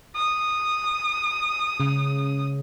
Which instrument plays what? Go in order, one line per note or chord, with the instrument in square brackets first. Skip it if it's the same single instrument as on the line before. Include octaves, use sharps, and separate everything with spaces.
[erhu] D#6
[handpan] C#3